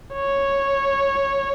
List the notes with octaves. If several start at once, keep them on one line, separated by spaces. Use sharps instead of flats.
C#5